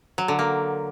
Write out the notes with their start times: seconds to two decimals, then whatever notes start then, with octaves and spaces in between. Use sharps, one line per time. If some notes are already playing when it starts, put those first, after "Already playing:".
0.18 F#3
0.28 D3
0.39 A#3